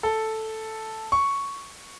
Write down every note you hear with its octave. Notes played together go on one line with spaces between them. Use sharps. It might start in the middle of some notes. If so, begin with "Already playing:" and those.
A4
C#6